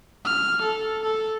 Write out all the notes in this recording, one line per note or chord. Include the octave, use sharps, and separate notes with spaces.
F6
A4
A4